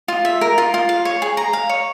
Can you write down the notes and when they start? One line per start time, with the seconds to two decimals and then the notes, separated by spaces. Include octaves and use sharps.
0.08 F4
0.25 E5
0.41 A#4
0.58 F4
0.74 F4
0.89 F5
1.05 C#5
1.22 G#4
1.37 A#5
1.53 F5
1.69 C#5